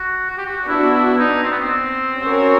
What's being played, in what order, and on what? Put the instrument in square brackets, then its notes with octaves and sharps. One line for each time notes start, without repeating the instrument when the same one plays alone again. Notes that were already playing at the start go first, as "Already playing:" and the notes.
Already playing: [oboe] F#4
F#4
G4
F#4
[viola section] B3 D4 F#4 [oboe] E4
[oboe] E4
D#4
C4
B3
C4
[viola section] C#4 F#4 A#4 C#5